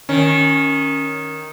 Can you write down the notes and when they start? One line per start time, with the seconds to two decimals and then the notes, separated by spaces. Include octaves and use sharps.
0.09 D#3 C#4